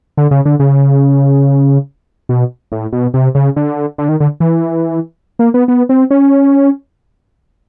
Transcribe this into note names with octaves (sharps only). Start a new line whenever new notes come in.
D3
C#3
D3
C#3
B2
A2
B2
C3
C#3
D3
D3
D#3
D3
E3
A#3
B3
B3
C4
C#4